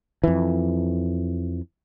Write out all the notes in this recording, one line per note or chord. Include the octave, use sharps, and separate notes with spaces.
F2 E3